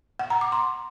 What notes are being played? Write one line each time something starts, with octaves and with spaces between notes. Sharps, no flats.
F#5
A#5
D6
C6